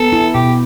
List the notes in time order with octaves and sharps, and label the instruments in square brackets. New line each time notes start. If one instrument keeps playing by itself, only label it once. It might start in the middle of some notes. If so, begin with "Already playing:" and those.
Already playing: [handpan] B3 [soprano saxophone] A4
[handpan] E4
[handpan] B2 [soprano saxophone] G4